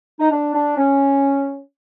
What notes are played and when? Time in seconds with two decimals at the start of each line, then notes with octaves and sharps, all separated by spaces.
0.20 D#4
0.31 D4
0.54 D4
0.77 C#4